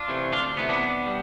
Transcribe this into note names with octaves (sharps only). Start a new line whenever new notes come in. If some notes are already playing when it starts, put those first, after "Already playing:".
Already playing: D4 F4
C3 E3 A3
D2 D4 F4
C3 E3 A3 B3
B3 D4
B1
G3